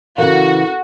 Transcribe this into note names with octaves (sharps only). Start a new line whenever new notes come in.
C#3 E3 F#4 A4 A#4 F5